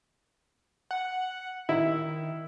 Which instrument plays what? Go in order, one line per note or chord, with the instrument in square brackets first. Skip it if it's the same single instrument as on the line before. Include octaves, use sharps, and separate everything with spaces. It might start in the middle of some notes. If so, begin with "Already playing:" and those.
[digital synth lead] F#5
[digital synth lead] D#3 [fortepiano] E4